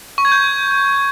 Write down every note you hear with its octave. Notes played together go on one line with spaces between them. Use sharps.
C#6
G#6
G6